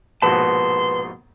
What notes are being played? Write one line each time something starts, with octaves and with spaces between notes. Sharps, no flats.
A#1 G#2 B2 B4 A5 C6